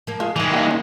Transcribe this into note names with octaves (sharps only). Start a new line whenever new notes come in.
F3 A#3
G#3 F4
D#3 E3 G3 G#3
D#2 F5 G5
C#4 E4